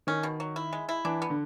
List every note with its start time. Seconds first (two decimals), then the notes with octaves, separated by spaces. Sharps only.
0.07 D#3 C#4
0.23 B2
0.40 F#3
0.56 E4
0.73 G#3
0.89 E4
1.05 E3 D4
1.22 B3
1.30 D3